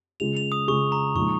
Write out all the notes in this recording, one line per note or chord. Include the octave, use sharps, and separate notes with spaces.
C#3 G#3 F4 G#4 F7
F7
D#6
C#3 G#3 F4 G#4 C#6
A#5
A#2 F3 G#3 D#4 C#6